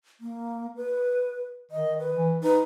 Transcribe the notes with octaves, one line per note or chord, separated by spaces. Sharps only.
A#3
B4
D#3 D#5
B4
E3
D#4 B4